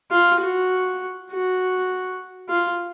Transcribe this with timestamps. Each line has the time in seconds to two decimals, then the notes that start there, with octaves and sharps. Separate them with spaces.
0.11 F4
0.41 F#4
1.31 F#4
2.49 F4